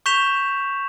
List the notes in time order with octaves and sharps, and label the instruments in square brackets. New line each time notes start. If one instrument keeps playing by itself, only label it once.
[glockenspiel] C#6 G6 B6 E7 F7